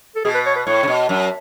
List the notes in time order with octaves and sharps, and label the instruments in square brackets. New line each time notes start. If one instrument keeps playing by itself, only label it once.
[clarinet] A4
[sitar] B2 [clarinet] G#4
[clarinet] B4
C#5
B4
[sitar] A2 [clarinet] C#5
[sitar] C#3
B2
F#2